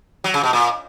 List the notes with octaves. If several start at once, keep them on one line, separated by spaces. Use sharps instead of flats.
F#3
C#3
B2
A#2